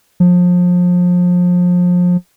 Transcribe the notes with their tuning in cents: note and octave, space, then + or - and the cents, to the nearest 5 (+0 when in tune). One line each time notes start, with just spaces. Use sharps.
F3 +30